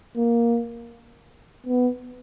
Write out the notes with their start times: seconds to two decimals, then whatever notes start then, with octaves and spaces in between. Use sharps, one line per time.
0.16 A#3
1.66 B3